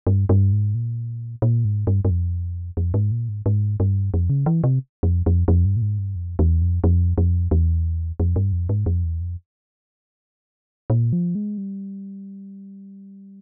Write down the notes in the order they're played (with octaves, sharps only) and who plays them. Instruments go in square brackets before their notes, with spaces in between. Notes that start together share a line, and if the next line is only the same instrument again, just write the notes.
[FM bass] G2
G2
G#2
A#2
A#2
G#2
G2
G2
F2
F2
G#2
A#2
G#2
G#2
G2
F2
C#3
E3
C3
F2
F2
F2
G2
A#2
G#2
G2
F2
E2
F2
F2
F2
E2
F2
G2
F2
G#2
F2
E2
F2
A#2
F3
G#3
G3